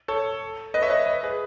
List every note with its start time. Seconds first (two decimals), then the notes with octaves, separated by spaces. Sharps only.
0.08 A4 C#5
0.74 B4 D#5
0.82 C#5 E5
0.90 B4 D#5
1.06 B4 D#5
1.23 G#4 B4